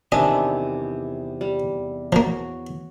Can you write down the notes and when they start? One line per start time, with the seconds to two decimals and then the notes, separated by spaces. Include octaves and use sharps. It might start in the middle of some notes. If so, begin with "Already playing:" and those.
0.12 E2 C3 D#3 D4 D#5 E5 G#5
1.41 G3
2.12 F3 A#3 F#4 C#5